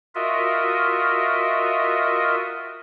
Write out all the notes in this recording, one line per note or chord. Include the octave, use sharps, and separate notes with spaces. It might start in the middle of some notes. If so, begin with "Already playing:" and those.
F4 F#4 A#4 D#5 E5